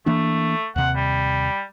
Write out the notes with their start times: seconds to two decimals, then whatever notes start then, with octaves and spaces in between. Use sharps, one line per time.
0.06 E3 A3 A#3 D4
0.76 D#2 C3 F#5
0.95 G3